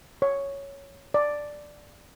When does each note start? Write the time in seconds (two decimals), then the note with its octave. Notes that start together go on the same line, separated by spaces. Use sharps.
0.22 C#5
1.14 D5